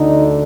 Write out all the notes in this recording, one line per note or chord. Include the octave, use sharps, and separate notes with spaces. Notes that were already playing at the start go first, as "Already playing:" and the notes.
Already playing: D2 D3 D#4